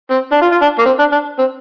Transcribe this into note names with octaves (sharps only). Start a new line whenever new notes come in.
C4
D4
F4
F4
D4
A#3
C4
D4
D4
C4